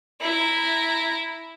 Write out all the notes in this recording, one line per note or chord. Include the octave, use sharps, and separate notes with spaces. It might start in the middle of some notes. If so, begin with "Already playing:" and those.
E4 A#5